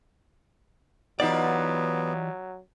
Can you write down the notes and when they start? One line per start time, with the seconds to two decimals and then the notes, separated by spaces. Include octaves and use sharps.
1.20 E3 F#3 B3 D#4 F4 G4 D5